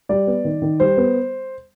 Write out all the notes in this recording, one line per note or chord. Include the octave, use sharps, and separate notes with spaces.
G3 D5
B3
D#3
D#3
G3 C5
B3